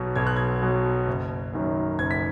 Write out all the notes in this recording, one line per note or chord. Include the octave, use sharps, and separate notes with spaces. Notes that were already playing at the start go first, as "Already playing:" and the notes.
Already playing: B1 B2 F#3
B1 G#6
F#6
G#6
B2 F#3
F#1
F#2 D#3 F#3
F#1 G#6
B6